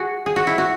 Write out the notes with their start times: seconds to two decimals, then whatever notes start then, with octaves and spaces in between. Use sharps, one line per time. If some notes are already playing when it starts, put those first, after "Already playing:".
Already playing: F#4 G#4
0.26 G#4
0.36 F#4
0.47 E4
0.58 F#4